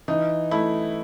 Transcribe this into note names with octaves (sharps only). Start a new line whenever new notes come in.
E3 D#4
A3 E4